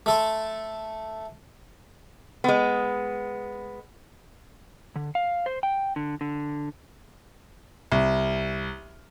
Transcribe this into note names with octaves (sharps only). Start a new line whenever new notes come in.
A3 A4 C6
G#3 B3
D3
F5
C5
G5
D3
D3
C2